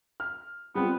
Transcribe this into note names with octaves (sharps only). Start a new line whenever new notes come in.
F6
G3 B3 C4 F4